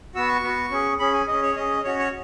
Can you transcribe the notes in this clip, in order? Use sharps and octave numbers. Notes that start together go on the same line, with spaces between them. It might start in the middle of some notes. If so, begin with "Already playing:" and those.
B3 F#4 E6
C#6
B3 F#4
C#4 G#4
C#4 G#4 B5
G#5
C#4 G#4 D#5
C#5
C#4 G#4 D#5
C#4 F#4 C#5
C#5